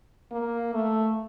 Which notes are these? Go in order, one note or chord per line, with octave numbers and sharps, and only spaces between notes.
A#3
A3